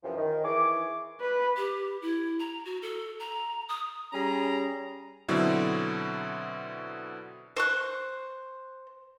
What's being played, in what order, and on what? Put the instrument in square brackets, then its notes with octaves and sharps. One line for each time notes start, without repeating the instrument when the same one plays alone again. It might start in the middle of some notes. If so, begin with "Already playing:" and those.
[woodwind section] F#2 C3 E3 F3
D#3
E3 G#4 C#6 D6
[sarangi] B4
[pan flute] G4
E4
A#5
F#4
A4
A#5
D#6
[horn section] G3 C#4 G#4 A#5
[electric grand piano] B2 D3 F#3 C4 E4
[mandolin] C5 C#6 F#6